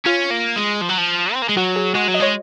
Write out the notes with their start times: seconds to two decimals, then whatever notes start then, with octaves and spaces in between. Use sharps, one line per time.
0.05 C#4 F4
0.30 A#3
0.56 G#3
0.81 F3
0.89 F#3
0.97 F3
1.33 C4
1.42 A#3
1.49 G#3
1.57 F#3 F#4
1.76 G#4
1.95 G#3 F#4
2.08 F#3
2.14 D#5
2.20 G#3 C#5